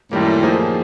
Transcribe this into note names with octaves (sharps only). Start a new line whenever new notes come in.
F#2 A2 D#3 G3 A#3
F3 A#3 D#4 G#4 C5